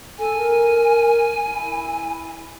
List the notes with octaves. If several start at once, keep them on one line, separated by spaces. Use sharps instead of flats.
A4 G#5
A#4
E4